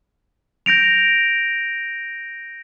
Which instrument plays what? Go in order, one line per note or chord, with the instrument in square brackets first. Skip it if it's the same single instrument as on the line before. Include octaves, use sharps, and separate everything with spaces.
[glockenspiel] G6 A#6 D7 F7